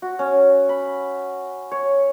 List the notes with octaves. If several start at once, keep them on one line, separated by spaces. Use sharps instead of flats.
F#4
C#4
B5
C#5